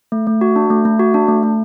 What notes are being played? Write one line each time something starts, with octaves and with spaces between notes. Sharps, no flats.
A3
A3
F#4
D4
A3
A3
F#4
D4
A3
A3